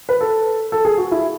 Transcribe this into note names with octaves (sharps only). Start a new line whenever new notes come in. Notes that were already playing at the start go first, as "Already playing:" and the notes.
B4
A4
A4
G#4
F#4
E4